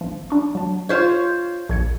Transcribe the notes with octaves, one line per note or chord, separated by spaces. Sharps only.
G#1 F3
D4 C#6
F#3 A5
F4 C5 C#5
A#1 G#6 C#7